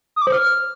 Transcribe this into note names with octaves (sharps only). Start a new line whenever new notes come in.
D#6
D6
C5
F6